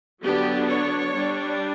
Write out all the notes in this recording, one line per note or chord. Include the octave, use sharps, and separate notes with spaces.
D3 F#3 B3 D4 G4
C#5
G3 D4